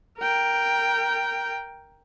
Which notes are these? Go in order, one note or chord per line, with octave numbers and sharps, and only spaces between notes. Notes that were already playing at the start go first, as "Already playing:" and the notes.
A#4 G5